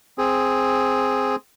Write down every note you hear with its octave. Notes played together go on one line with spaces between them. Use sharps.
C4 G#4